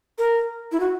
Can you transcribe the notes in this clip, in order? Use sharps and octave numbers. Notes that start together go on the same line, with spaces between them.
A#4
E4
F#4